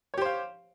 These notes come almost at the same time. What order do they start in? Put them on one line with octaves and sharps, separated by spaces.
C#5 G4 C5 F5